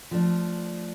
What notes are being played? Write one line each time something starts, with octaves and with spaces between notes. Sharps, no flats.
F3 A3 D4